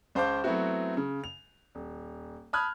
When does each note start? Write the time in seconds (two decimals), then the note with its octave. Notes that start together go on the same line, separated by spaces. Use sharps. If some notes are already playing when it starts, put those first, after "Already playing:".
0.15 C#2 C5 F5 A5 D6 G6
0.44 F#3 A3 B3 C4 E4 F#4
0.97 C#3
1.24 F7
1.75 D#1
2.53 A5 B5 D#6 F6 F#6 G#6